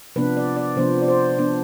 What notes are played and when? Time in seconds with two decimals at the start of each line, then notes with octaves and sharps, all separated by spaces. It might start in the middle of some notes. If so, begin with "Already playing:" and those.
0.16 C3 F3 B3 D4 B4
0.37 D5
0.56 D5
0.76 C3 F3 B3 D4 C5
1.02 D5
1.08 C5
1.39 F3 B3 D4